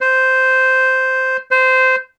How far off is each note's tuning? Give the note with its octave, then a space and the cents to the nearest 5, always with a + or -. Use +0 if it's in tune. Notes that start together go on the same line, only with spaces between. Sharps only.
C5 -5
C5 -15